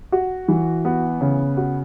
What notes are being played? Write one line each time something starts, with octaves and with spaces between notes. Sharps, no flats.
F#4
E3
B3
C#3
F#4